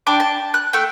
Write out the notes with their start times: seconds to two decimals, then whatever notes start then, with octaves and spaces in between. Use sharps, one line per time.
0.07 D4 G5 D6
0.20 A5
0.54 F#6
0.73 A3 G5